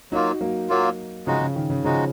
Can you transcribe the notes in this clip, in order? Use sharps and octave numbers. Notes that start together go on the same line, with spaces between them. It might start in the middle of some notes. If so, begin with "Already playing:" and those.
F#3 A#3 D#4 F4 F#4
F#3 A#3
F#3 A#3 F4
C#3 F3 G#3 D#4 F#4
C#3
D#3
C#3
C#3 F3 G#3 D#4 F#4